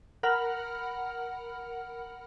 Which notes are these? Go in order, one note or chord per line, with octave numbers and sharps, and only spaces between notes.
A#4 F#5 B5 F6